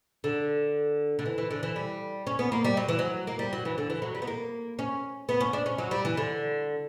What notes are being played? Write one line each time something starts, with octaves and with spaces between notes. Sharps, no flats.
D3
D3
E3
E3
D3
E3
G3
C#4
B3
A#3
G3
F#3
E3
F#3
A#3
G3
F#3
E3
D3
E3
F#3
G3
B3
A#3
C#4
B3
C#4
D4
C#4
F#3
G3
E3
D3